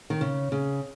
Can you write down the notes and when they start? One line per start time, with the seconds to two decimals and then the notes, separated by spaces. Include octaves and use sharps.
0.10 D#3
0.21 C#3
0.52 C#3